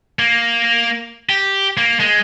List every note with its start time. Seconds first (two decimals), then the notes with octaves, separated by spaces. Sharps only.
0.19 A#3
1.29 G4
1.77 A#3
2.00 G#3